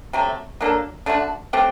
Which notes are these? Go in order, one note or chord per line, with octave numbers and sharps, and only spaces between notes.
C3 F#3 A3
F#3 A#3 D4 A4
D3 A3 D4 F#4
F#3 A3 C4 G4